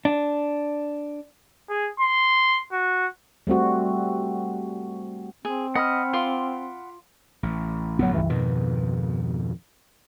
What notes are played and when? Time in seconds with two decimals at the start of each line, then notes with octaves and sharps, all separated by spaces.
0.05 D4
1.69 G#4
2.00 C6
2.72 F#4
3.47 G3 A3 C4 F#4
5.45 C4 G#4
5.75 D#5 F#5 B5 F6
6.13 F4 C6 D6
7.43 A1
7.99 A1 F#2 D3 F#3 B3
8.14 C#2 G2 E3
8.30 F2 G#2 B2 D#3